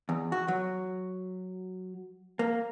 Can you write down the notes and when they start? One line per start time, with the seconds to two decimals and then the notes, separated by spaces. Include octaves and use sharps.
0.09 E2
0.32 F#4
0.48 F#3
2.39 A#3